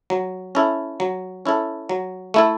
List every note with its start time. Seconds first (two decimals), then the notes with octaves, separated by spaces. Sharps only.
0.10 F#3
0.55 C#4 E4 A4
1.00 F#3
1.46 C#4 E4 A4
1.89 F#3
2.34 A3 E4 A4